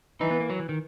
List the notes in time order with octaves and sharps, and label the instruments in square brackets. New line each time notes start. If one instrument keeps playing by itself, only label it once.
[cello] E3 [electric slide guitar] D#4
[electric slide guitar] B3
A#3
F#3
E3
D#3